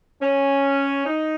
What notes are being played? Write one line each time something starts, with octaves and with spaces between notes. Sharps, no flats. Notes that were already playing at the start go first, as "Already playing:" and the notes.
C#4
D#4